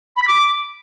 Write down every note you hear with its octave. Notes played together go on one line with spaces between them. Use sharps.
B5
B6
D6